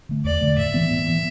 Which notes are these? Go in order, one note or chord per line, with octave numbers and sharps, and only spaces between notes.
D3 A3
E2 D5
D3 A3
A2 E5
E3 B3
A2
E3 B3